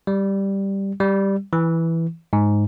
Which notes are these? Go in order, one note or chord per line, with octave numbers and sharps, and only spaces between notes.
G3
G3
E3
G#2